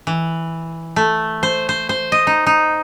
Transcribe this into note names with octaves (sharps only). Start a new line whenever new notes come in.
E3
A3
C5
C5
C5
D#5
D#4
D#4